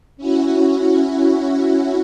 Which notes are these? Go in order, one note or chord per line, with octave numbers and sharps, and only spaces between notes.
C#4 E4 F#4